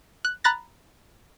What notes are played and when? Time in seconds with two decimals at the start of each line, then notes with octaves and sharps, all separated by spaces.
0.25 F#6
0.44 A#5 B5 F#6 A6 A#6